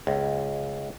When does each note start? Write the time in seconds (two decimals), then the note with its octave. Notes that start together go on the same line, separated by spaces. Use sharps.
0.07 C#2